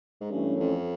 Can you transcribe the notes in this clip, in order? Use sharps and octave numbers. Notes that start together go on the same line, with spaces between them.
G#2
G2 E3 A3 C#4
F#2
F2